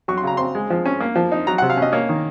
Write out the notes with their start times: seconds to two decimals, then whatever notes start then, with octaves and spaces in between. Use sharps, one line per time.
0.08 F#3 C#6
0.17 C6
0.23 C#3 A#5
0.37 C4 C6
0.55 G#3
0.70 F3
0.85 C#4
1.00 A#3
1.16 F3
1.32 D#4
1.47 F#3 A#5
1.58 F#5
1.62 C3
1.70 F5
1.77 C#4 D#5
1.92 A#3 C#5
2.09 D#3